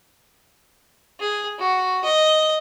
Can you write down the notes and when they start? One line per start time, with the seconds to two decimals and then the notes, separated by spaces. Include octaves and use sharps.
1.20 G#4
1.59 F#4
2.04 D#5